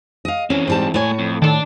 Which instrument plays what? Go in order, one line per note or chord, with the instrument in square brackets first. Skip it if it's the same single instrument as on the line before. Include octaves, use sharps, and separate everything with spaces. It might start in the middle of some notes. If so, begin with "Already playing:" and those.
[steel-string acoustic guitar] D#5 F5
[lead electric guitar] E3 C4 [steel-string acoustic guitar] C#4
[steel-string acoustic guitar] G#2 G3 A5
[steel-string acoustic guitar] A2 C#5 [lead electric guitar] A3 G#5
[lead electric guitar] F2
[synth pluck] D#3 A4 [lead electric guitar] D4